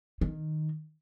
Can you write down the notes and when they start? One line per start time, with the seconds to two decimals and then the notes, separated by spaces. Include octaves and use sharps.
0.21 D#3